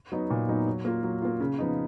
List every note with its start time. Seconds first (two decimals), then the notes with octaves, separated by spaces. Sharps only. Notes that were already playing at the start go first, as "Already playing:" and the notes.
0.12 F#3 B3 D#4
0.30 A#2
0.48 F#3 B3 D#4
0.67 F#3
0.85 A#3 F4
1.03 F#3
1.22 A#3 F4
1.40 C#3
1.59 F3 B3 D#4